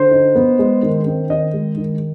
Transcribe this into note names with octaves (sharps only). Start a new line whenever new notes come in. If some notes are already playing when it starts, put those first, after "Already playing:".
Already playing: D3 C5
D#4
B3
G#3
D#3
C4
D#3 D#5
G#3
D#3